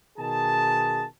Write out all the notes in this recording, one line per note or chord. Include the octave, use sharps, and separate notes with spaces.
B2 D#3 G#4 A5